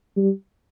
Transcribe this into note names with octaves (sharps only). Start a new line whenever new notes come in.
G3